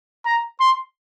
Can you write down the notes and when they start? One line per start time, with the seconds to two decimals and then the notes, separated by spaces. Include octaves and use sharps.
0.25 A#5
0.60 C6